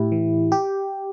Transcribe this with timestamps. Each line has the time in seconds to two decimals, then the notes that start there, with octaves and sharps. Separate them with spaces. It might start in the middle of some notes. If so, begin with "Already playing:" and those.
Already playing: A2 E4 G4
0.12 E3
0.52 G4